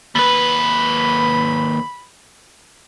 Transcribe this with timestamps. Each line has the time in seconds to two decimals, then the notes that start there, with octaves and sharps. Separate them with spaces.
0.15 D#2 B4 B5